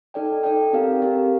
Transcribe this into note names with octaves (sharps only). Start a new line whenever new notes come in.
D#4 A4 D5 G5
D#4 A4 D5 G5
C4 G4 A#4 F5
C4 G4 A#4 F5